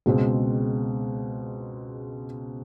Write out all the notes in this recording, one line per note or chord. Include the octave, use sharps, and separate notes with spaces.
C#2 B2 G#3 C4